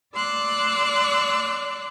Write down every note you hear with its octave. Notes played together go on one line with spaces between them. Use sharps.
D5 C6 D6 E6 F#6